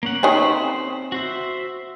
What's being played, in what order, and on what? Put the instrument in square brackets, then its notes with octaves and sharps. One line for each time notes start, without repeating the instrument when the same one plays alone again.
[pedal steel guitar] A#3 C#4 F#5
[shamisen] D#3 C#4 [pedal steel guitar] C4 C5 B5
[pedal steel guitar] F#4 C5 E5